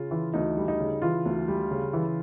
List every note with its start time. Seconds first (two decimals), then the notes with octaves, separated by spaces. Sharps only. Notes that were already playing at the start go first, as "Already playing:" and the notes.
Already playing: C#3 F4
0.11 E3
0.34 D2 D#4
0.57 G3
0.68 D#4
0.80 C#3
1.02 E3 F4
1.26 D2
1.48 G3
1.71 C#3
1.93 E3